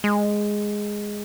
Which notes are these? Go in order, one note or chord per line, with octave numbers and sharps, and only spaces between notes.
G#3